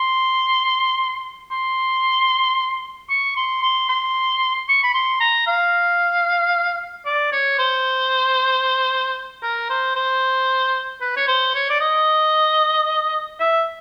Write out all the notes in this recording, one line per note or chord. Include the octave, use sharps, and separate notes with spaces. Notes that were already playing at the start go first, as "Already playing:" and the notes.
Already playing: C6
C6
C#6
C6
C6
C6
C#6
B5
C6
A#5
F5
D5
C#5
C5
A#4
C5
C5
B4
C#5
C5
C#5
D5
D#5
E5